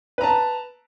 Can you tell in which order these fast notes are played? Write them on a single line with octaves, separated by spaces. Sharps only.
B4 A#5 A5